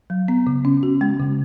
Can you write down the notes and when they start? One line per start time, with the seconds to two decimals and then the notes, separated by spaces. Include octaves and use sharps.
0.10 F#3
0.28 B3
0.47 C#3
0.65 C#4
0.83 F#4
1.01 G#3
1.20 C#3